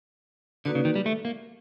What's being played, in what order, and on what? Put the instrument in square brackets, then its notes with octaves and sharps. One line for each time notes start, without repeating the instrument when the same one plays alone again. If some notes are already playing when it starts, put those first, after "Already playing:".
[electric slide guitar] D3 [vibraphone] A#3 D#4 F#4 B4 D5
[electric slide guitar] C#3
D#3
G3
A3
A#3